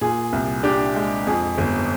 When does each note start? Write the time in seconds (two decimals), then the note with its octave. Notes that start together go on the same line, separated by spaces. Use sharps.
0.01 A#2 G#4
0.33 C2
0.63 D4 G4
0.95 G#3
1.27 F2 G#4
1.58 G1